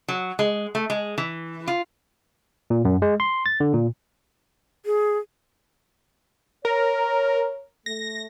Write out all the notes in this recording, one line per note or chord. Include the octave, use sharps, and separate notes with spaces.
F#3
G#3
A3
G#3
E3
F4
A#2
F#2
G#3
C6
A6
D3
A#2
G#4
A#4 C#5
A3 A#6